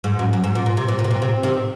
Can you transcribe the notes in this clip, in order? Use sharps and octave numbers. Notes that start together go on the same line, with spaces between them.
G#2
F#2
F#2
G#2
A#2
A#2
C3
A#2
A#2
C3
A#2
C3
C3 D#3